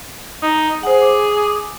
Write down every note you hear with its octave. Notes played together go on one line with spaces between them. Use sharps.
D#4
G#4 C5 F#5
D6